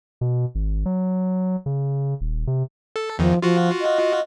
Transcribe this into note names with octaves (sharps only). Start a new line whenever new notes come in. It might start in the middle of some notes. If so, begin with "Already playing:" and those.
B2
G#1
F#3
C#3
D#1
C3
A4
E2 D#3 F3
F3 F4 F#4
D#5